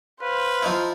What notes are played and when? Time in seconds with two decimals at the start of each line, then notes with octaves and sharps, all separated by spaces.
0.21 B4 C5 F5
0.62 F3 D#4 E4